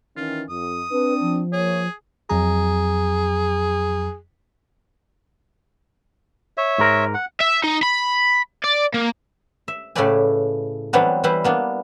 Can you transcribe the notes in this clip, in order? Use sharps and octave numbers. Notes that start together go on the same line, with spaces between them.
D#3 E3 C#4 F4
F2 D#6
C4 D4 B4
F3
A#3 G#4 C#5
F2 F#3 G#4 A#5
C#5 E5
G#2 G#3 A#4
F#5
E5
D#4
B5
D5
A#3
E5
A2 C#3 A3 B4 D5 G#5
E3 F#3 G3 B3 C4 D4
E3 G3 E4 B4 C5
A#3 B3 D4